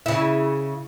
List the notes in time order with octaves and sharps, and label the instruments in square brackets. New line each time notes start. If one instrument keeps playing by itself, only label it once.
[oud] C#3 E4